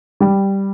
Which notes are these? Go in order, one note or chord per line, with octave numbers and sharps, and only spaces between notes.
G3